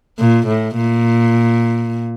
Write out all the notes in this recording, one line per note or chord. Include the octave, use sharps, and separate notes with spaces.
A#2
A2
A#2